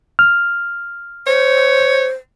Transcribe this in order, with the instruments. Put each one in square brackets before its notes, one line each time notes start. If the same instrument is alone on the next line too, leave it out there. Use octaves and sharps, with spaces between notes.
[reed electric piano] F6
[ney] C5 [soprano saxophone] C#5